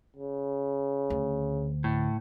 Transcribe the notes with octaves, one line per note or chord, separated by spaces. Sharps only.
C#3
D2
A2